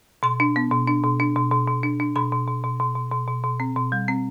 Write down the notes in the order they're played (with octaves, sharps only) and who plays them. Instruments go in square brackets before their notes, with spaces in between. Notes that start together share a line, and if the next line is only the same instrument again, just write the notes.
[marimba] B2 C6
D4
B3
B2
D4
B2
D4
B2
B2
B2
D4
D4
B2 B5
B2
B2
B2
B2
B2
B2
B2
B2
C4
B2
G3
C4